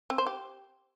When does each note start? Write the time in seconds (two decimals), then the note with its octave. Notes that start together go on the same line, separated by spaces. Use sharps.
0.10 C4
0.18 C5
0.26 G4